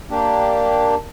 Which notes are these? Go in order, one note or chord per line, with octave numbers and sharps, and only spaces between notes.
A#3 D4 G4